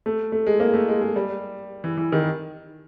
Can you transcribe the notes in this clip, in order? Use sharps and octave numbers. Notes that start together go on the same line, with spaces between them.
A3
A3
G#3
A#3
A3
G#3
G#3
G3
E3
E3
D#3